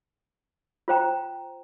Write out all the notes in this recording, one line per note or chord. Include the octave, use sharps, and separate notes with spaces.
F4 C5 G5 A#5